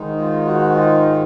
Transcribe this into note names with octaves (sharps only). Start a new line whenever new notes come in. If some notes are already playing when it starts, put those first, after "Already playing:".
Already playing: G#2 D#3 G#3 D#4
F4
F#4
F4